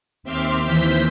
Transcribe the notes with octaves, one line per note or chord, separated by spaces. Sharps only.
D#2 C4 E5 C6 D6 F6
D#2 E3 C5 G6 B6